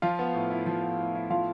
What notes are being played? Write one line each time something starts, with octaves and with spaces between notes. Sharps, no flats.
F3 F4 F5
B3
A2
E4
F3
B3
A2
E4
F3 F4 F5